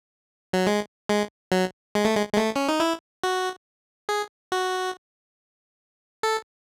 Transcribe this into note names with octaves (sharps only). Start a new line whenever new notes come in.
F#3
G#3
G#3
F#3
G#3
A3
G#3
G#3
A3
C#4
D#4
E4
F#4
G#4
F#4
A4